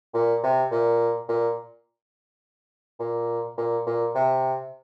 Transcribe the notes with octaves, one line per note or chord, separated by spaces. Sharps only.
A#2
C3
A#2
A#2
A#2
A#2
A#2
C3